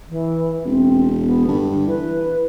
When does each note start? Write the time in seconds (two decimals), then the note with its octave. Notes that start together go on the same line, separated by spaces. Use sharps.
0.10 E3
0.65 E1 C4
1.23 B3
1.48 G2 D3
1.87 E3 B4